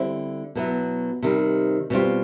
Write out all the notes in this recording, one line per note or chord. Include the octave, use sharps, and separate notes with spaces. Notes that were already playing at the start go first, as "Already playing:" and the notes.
Already playing: D3 G3 C4 E4
B2 F#3 B3 E4
C3 D#3 G3
B2 G3 C4 F4